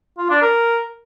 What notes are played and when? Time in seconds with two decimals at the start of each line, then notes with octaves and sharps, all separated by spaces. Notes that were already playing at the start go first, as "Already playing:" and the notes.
0.18 F4
0.30 D4
0.42 A#4